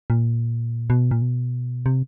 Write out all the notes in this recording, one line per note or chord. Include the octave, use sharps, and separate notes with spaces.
A#2
B2
A#2
B2
C3